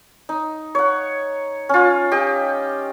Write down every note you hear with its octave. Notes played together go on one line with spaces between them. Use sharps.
D#4
C#5 F#5
C#4 F4
G4 D#5